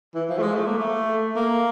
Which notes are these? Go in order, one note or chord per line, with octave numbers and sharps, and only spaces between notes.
E3
F3
A3
G#3
A3
A#3
A3
A#3